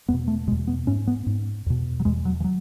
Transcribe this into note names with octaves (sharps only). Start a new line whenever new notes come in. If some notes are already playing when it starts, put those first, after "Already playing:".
E2 B2 B3
A3
E2 B2 G#3
B3
G#2 C#4
B3
G#2
E2 B2
F#3
E2 B2 G#3
F#3
E3
F#3